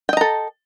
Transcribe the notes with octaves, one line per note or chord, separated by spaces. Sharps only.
A4 D#5 G5 A#5